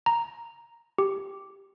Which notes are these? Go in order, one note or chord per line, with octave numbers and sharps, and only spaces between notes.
A#5
G4